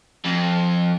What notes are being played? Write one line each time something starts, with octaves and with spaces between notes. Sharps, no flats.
F2